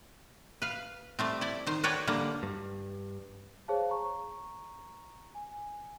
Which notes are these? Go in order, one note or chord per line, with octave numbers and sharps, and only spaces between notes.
B4 F5
G3 A3 C4
E4 D5
D#3 C5
F#4 A4 B4 C#5 D5 G5
D3 G3 A#3
G2
G#4 C5 C#5 F5 A5
A#5 C#6
G#5